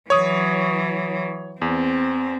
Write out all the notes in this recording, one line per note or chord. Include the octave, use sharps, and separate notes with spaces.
E3 F#3 C#5 D#6
E2 C4